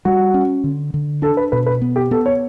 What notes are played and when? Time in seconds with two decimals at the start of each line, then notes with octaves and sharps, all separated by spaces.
0.05 G3 F#4
0.34 C#4
0.64 D3
0.94 D3
1.22 D4 A4
1.37 B4
1.52 B2 B4
1.66 B4
1.82 B3
1.96 G4
2.11 B3 A4
2.26 C#5